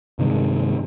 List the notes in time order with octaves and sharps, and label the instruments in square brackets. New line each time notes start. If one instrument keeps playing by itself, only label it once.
[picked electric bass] G2 C3 D#3 G#3